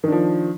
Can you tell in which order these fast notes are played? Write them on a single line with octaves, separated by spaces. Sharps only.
D#3 D4 F3